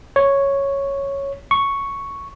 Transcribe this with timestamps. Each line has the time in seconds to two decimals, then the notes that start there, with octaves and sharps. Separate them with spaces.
0.16 C#5
1.51 C#6